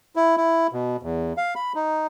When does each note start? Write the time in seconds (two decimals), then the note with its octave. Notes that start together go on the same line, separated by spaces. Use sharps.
0.16 E4
0.37 E4
0.73 B2
1.03 E2
1.37 F5
1.55 B5
1.75 D#4